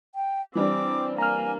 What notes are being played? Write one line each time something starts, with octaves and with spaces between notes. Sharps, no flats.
G5
E3 G3 C4 D4 D6
A#3 G#5 A#5 F6